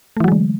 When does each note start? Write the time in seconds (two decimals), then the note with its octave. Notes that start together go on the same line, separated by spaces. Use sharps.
0.17 A3
0.20 E3
0.24 F#3
0.28 G#3
0.32 D3